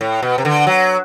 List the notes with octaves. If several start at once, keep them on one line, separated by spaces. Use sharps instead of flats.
A2
B2
C3
D3
F#3